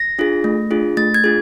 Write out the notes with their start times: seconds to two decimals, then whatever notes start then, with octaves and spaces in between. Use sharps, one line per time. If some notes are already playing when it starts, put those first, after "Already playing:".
Already playing: A#6
0.19 D4 F4 G#4
0.44 A3
0.71 D4 F4 G#4
0.97 A3 A6
1.14 G#6
1.24 D4 F4 G#4